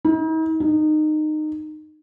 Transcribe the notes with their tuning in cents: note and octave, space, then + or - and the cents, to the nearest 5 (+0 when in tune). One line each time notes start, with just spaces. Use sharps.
D#4 +45
D#4 -20